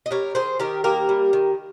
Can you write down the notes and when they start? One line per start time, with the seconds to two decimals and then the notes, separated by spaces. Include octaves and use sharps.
0.06 D#5
0.11 G3 A#4 C#5
0.35 D#3 G#4 C5
0.60 D#3 G4 A#4
0.84 A#3 G4 A#4
1.09 G3
1.33 D#3